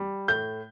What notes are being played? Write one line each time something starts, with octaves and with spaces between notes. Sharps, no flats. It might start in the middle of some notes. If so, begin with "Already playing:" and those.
Already playing: G3
A2 G6